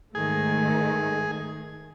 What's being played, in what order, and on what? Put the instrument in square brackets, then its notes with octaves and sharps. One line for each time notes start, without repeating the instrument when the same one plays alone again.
[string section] G#2 D#3 A3 [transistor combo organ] G#4